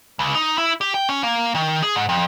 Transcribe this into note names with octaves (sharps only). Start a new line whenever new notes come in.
C#2
D#4
E4
G4
G5
C#4
A#3
D#3
G#4
G#2
F2